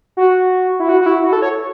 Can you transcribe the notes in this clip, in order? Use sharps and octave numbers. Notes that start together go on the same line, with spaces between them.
F#4
E4
F#4
F#4
E4
F#4
A4
C#5